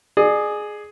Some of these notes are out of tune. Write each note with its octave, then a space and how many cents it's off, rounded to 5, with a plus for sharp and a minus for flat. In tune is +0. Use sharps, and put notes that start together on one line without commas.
G#4 +10 D5 +40